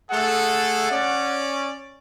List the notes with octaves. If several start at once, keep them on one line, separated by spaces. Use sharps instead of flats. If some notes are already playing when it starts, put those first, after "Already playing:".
A3 G#4 A4 F#5
C#4 D5